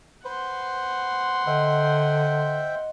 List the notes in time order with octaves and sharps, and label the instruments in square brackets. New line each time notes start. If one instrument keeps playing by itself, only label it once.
[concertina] B4 C5 [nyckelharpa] F#5 C6
[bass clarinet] D3 [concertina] C5 E5 G5 [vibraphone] D#5